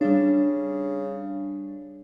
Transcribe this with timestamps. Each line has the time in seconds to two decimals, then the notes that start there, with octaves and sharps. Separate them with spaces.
0.01 C#3 G3 D4